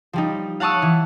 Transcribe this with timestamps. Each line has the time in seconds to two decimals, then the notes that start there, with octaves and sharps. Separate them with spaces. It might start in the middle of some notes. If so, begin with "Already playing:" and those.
0.13 F3 G3 D#4
0.60 F5 F#5 A5 C#6 D#6 E6
0.82 E3